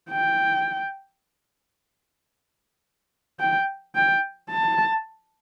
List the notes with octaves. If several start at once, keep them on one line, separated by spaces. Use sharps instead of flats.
G5
G5
G5
A5